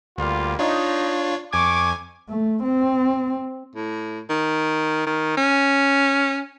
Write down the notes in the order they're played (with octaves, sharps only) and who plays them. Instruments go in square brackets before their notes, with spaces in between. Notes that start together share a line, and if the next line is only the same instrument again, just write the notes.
[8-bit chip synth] D2 [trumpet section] G3 A#3 F4
[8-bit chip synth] D4 F4 C#5 [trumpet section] D#4
[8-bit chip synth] F2 G#5 G#6 [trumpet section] C#6 D6
[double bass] A3
C4
[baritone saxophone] A2
D#3
D#3
C#4